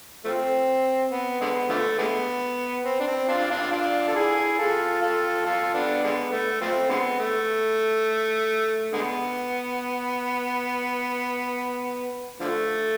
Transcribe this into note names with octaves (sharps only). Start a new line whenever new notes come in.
F3 A3 C4
B3
D3 G#3 B3
D3 F3 A3
D3 G#3 B3
C4
D4
C4
D4 F4
D4 F4
D4 F4
A4
E4 G#4
F4 A4
F4 A4
F4 A4
B3 D4
D3 G#3 B3
A3
F3 A3 C4
D3 G#3 B3
A3
D3 G#3 B3
D3 F3 A3